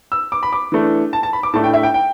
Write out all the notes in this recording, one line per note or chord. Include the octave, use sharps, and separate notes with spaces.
E6
D6
B5
D6
E3 A3 D4
A5
A5
B5
D6
A2 A3 D4 A5
G5
E5
G5
G5